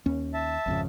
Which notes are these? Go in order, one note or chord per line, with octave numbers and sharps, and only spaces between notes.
D#2 C#4
E5 A5
G#1 F2 C#3